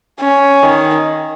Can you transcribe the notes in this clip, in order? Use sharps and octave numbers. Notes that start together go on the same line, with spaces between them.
C#4
D#3